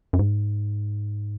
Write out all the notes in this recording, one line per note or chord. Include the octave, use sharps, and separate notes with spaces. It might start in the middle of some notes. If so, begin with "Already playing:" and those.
F#2
G#2